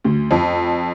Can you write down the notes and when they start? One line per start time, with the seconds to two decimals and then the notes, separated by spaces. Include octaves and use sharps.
0.04 D2
0.31 F2